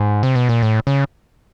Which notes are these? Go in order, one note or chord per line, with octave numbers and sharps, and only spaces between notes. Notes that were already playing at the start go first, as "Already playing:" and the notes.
Already playing: G#2
C3
B2
A#2
A2
C#3